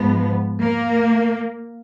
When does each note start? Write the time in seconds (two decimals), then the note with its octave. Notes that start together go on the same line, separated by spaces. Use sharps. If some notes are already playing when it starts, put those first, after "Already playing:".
Already playing: G#2 F3 G#3 B3
0.60 A#3